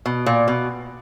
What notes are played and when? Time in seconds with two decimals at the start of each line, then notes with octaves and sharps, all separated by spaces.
0.06 B2
0.26 A#2
0.48 B2